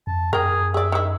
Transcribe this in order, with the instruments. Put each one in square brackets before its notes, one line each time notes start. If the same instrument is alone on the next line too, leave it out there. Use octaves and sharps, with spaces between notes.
[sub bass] F2 [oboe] A5
[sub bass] F#2 [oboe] G#4 [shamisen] A#4 G5
[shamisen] G#4 D5 [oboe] E5
[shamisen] D#3 E4